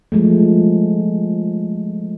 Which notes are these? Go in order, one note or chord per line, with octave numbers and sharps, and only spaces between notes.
F3 G#3 A3